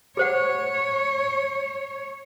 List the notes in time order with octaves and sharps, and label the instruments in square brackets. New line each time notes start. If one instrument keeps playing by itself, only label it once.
[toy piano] G#4 C5 F#5 [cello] C#5